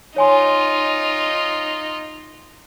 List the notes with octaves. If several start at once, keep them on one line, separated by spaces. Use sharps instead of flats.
D#4 F4 C#5 G#5 C6